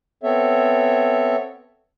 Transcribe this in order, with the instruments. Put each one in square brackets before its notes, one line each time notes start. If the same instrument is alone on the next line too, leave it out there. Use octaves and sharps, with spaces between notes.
[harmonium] B3 C4 A4 C#5 E5